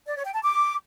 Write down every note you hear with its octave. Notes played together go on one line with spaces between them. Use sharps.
D5
C#5
G5
A5
D6